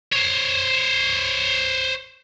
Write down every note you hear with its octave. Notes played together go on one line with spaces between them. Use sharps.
C5 C#5